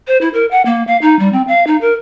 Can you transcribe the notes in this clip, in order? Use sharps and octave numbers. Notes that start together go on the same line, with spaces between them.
C5
E4
A#4
F#5
A#3
F5
D#4
G3
C4
F5
D#4
A#4